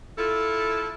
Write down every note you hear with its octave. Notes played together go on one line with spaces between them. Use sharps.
E4 F4 A4